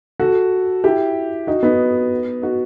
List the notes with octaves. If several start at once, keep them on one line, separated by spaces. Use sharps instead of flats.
F#4 A4
E4 G4
D#4 F#4
B3 D#4
D#4 F#4